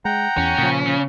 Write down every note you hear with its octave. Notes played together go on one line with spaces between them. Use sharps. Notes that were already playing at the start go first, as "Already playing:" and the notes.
G#3 F#5 G5 A#5
E2 C#4
A#2 C#3 F3
C#3